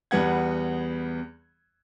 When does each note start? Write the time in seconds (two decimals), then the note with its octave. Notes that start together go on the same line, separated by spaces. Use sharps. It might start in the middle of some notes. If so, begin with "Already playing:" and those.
0.11 E2 G3 B3 F#5 G#6